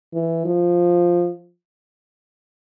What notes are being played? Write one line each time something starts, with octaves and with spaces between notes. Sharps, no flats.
E3
F3